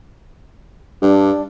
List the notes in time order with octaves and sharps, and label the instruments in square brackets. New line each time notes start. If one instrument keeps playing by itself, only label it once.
[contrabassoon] G2 [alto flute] D4